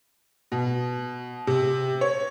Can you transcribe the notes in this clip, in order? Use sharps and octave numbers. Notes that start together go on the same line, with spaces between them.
B2
C3
C#5